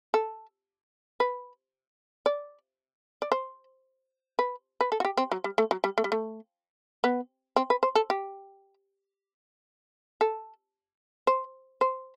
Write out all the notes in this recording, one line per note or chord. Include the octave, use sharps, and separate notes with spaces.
A4
B4
D5
D5
C5
B4
B4
A4
F#4
G4
C4
F#3
G3
A3
F#3
G3
A3
G3
A3
B3
C4
B4
C5
A4
G4
A4
C5
C5